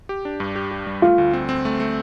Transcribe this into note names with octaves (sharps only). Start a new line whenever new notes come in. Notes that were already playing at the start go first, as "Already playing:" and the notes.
G4
D4
G2
G4
G4
G3
A3 F4
D2
C4
C4
A3
A3